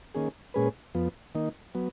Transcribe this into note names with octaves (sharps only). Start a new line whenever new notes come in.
D#3 A#3 C#4 G#4
A#2 G#3 C#4 G#4 B4
F2 F3 B3
D#3 A#3 D#4
F#3 B3